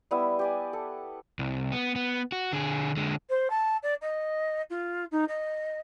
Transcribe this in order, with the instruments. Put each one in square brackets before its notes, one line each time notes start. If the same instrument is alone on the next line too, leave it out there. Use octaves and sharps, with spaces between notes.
[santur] G3 B3 E4 E6
G4 D5 G#5
A4
[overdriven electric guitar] C2
B3
B3
F#4
D3 G#4
D3 G#3
[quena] C5
A5
D5
D#5
F4
D#4
D#5